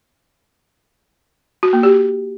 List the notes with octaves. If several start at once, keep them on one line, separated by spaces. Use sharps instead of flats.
F#4
A#3
G4